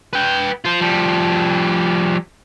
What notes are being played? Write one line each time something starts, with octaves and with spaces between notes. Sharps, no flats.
B4 G5
F4 C5
F3 G3